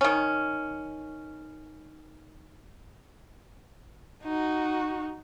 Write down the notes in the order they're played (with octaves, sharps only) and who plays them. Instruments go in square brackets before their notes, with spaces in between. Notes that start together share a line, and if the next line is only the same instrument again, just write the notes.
[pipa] D#3 C#4
[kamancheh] D#4 F#4